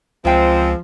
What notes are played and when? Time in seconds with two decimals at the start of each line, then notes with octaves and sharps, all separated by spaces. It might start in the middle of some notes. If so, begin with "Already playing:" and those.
0.25 C#2 F#2 F3 G#3 C4 G5